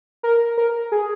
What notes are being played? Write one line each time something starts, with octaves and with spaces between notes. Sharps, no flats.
A#4
A#4
G#4